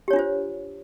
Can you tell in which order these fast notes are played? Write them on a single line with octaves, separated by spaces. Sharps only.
G4 C#5 D4 F4 C5